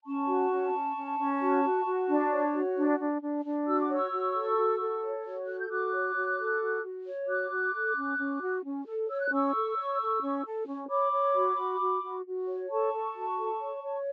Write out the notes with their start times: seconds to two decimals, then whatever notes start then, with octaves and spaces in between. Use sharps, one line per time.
0.05 C#4 A5 C#6
0.28 F#4
0.50 C#4
0.73 C#4
0.96 C#4
1.18 C#4
1.41 F#4
1.64 F#4
1.86 F#4
2.08 D4
2.31 C#5
2.54 F#4
2.76 D4
2.99 D4
3.22 D4
3.44 D4
3.67 F#4 E6
3.80 D6
3.90 C#5 C#6 E6
4.12 F#4
4.35 A4
4.57 F#4
4.80 A4
5.02 C#5
5.25 F#4
5.48 A4 F#6
5.59 G6
5.70 F#4 D6 F#6
5.93 C#5
6.15 F#4
6.38 A4
6.60 F#4
6.83 F#4
7.06 C#5
7.28 F#4 D6 F#6
7.51 F#4
7.73 A4
7.96 C#4
8.19 C#4
8.41 F#4
8.63 C#4
8.87 A4
9.09 C#5 E6
9.21 F#6
9.31 C#4 C#6 E6
9.54 A4
9.76 C#5
10.00 A4
10.22 C#4
10.45 A4
10.67 C#4
10.89 C#5 B5 D6
11.12 C#5
11.35 F#4
11.57 F#4
11.80 F#4
12.02 F#4
12.26 F#4
12.48 C#5
12.70 A4 A5 C#6
12.93 A4
13.15 F#4
13.38 A4
13.61 C#5
13.83 C#5